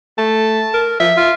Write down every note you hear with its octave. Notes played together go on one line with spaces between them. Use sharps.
A3 A5
A#4
F3 E5
F4